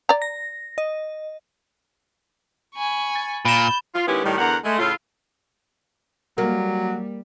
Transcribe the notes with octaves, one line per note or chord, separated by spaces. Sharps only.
D5 A#5
A#6
D#5
G#5 B5 C#6
A6
A#2 B5 G6 E7
F4
D#3 G#3 B3 C#4 E4 G4
A2 D#3 G3
E2 D3 A#4 F#5
G#3 A3
A2 C#3 E4 F4
F#3 G3 A#3